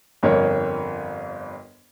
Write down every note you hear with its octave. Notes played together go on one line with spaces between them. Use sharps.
G1 F2 A#4 C#5